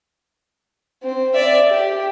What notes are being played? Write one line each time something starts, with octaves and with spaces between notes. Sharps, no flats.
C4
D5 E5
G4